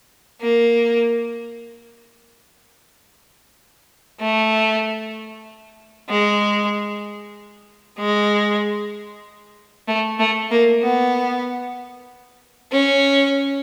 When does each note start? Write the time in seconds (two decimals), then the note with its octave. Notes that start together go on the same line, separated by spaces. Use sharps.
0.41 A#3
4.20 A3
6.09 G#3
7.99 G#3
9.88 A3
10.19 A3
10.51 A#3
10.82 B3
12.72 C#4